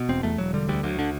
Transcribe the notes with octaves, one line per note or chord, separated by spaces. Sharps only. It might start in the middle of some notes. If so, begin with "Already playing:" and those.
Already playing: B2
E1 C4
E2 A3
E1 F#3
D3 G3
D2 G3
D2 F#3
D3